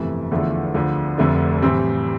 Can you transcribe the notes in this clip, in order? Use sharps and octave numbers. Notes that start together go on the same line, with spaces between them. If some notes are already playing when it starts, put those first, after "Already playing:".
Already playing: G1 F2 C3 E3 A3
E2 D3 F3 A3 E4
D2 D3 F3
F1 F2 D3 A3 D4
A2 E3 G3 C4